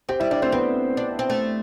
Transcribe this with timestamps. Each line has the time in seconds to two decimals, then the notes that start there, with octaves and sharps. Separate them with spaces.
0.09 C4 G4 G5
0.20 G3 E4 E5
0.31 G3 D4 D5
0.42 A3 C4 C5
0.52 B3 C4 B4
0.97 D4
1.19 C4
1.30 A3